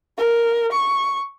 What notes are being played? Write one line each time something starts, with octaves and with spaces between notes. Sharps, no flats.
A#4
C#6